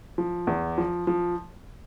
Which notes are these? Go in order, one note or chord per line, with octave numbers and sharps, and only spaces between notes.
F3
E2
F3
F3